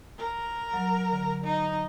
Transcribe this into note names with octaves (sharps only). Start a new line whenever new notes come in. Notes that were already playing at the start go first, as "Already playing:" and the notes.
A#4
F#3
D3
D#4